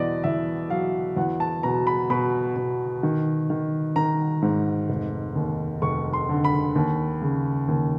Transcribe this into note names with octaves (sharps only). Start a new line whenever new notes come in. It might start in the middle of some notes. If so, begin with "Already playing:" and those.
Already playing: E2 B2 D5 D#5
E2 E5
F#3 F5
E2 F#5
A5
B2 A#5
B5
B2 B5
B2
D#3
D#3
D#3 A#5
G#2
F1
D#2
F1 C#6
C6
D3
B5
D#2
C#3
D#2